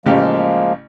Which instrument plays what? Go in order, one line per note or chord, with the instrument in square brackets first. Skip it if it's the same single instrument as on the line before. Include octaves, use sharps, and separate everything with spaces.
[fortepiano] A1 C#3 G4 [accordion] F3 G#3 A#3